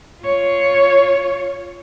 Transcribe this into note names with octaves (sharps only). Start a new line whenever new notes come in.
F4 C#5